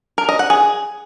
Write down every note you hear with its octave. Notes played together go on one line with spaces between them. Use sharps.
A#4
D#5
F#5
G#4